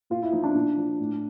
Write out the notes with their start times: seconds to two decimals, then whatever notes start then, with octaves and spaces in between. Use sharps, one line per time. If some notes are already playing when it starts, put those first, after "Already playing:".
0.10 A#2 F4
0.22 E4
0.32 F3 D#4
0.44 D4
0.54 A#2
0.78 F3
1.00 A2